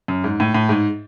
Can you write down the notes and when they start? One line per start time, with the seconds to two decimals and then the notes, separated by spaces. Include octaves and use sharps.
0.08 F#2
0.24 G#2
0.40 A2
0.54 A2
0.69 G#2